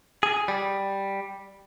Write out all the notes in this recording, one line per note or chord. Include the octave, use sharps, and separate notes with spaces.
G#4
G3